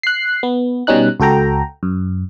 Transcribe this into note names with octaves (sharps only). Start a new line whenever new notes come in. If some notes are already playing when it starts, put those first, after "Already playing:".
F#6 C7
B3
B2 G3 C#4 D#4 F#6
C#2 F#4 A4 G5 A#5
F#2